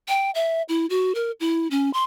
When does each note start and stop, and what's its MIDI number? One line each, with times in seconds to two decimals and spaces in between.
0.08 0.31 79
0.35 0.62 76
0.69 0.86 64
0.90 1.13 66
1.15 1.31 70
1.40 1.68 64
1.71 1.90 61
1.94 2.04 84